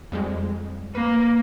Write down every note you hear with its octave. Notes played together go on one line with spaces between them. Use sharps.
F2 G3 G#3
A#3 B4